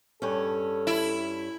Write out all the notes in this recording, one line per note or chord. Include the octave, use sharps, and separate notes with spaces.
G2 C#4 A4
E4